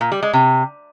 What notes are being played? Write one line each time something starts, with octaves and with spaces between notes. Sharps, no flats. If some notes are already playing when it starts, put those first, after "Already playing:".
A#2
G3
G#3
C3